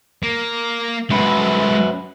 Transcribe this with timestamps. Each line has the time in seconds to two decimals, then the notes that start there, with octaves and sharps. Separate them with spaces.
0.23 A#3
1.10 F#2 G#3 A3 B4